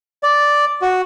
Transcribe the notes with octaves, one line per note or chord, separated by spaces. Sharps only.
D5
F#4